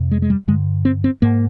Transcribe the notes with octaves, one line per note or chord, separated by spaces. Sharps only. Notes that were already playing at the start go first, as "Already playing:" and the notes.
Already playing: F2 C3
G#3
G#3
G3
G2 D3 G#3
C4
C4
G#2 A#3